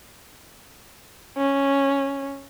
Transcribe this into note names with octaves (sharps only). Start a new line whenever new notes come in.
C#4